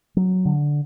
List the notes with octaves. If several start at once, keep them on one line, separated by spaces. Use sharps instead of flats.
F#3
D3